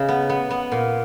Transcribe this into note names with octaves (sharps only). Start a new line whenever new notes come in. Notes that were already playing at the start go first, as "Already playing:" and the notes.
Already playing: C#3 D#4
B3
B3
B3
A#2